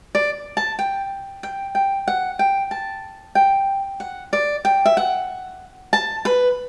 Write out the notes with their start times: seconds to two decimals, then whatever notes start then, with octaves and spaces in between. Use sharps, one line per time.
0.15 D5
0.57 A5
0.79 G5
1.43 G5
1.75 G5
2.08 F#5
2.39 G5
2.71 A5
3.35 G5
4.00 F#5
4.33 D5
4.65 G5
4.85 E5
4.97 F#5
5.93 A5
6.25 B4